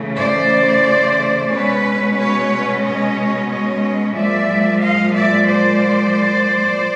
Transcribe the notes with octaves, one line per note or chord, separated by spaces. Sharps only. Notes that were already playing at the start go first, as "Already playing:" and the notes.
Already playing: C#3 E3 A3 C#4
C5 D5
B2 G#3 C#4 B4 C#5
B4 C#5
C#5 D#5
C#5 D#5
A#2 F3 G#3 D5 E5
D#5 F5
D5 E5
C5 D5